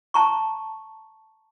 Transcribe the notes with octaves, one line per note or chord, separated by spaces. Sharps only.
A5 A#5 C#6